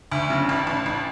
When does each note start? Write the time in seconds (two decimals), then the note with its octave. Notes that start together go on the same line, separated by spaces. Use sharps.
0.11 D2
0.30 C#3
0.49 A1
0.67 A1
0.86 A1